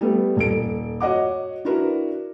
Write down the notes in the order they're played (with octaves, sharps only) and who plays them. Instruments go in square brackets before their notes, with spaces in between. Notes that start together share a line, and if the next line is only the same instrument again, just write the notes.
[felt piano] G3 A3 B3 A4 B4
D#1 A4 D7
F#4 C#5 D#5 F#5 D6
D4 E4 F#4 A#4 B4